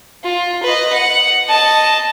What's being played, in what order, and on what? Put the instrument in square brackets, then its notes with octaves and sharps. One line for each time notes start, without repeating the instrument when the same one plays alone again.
[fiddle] F4
B4 D#5
F#5
D#5 A5